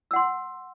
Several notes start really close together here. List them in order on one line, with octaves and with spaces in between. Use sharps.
E6 F#5 C6